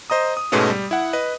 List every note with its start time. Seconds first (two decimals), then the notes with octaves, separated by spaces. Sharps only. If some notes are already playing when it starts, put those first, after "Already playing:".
0.10 C5 D#5 A#5 D#6
0.37 D#6
0.52 G#2 B2 G#3 A3 B3 C#4
0.70 G3
0.91 E4 F#5
1.13 B4 D#5